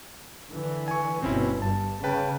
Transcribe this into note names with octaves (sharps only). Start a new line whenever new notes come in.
D3 E3
G#5 C#6
G1 B2 C4 C#4 E4
G2 A5
C#3 B4 G5 A5